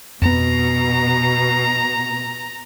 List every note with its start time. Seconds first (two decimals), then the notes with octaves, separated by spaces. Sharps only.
0.22 F2 B2 B3 A#5